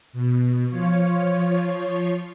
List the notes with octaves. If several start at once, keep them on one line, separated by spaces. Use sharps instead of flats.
B2
F3 F4 C#5